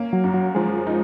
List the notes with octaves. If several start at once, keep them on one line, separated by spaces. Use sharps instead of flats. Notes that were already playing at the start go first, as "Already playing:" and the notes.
Already playing: A#3 C#4
F#3
F#2
F#3
F3 G#3
D#4